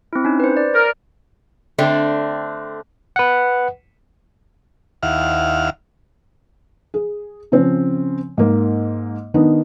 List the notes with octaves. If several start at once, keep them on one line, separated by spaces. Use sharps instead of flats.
C4 E4
C#4 D#4
B4 C5
D5
A#4
D3 A3 C4 D4
B4 F#5
D#2 E4 F5 F#5 F6
G#4
C#3 F3 C4
G#2 A#3
D#3 B3 D4 D#4